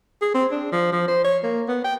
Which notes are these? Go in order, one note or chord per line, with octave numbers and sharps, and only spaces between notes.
G#4
C4
D4
F3
F3
C5
C#5
A#3
B3
G5